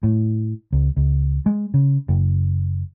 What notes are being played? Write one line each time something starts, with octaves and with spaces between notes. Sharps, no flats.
A2
C#2
C#2
G#3
C#3
F#1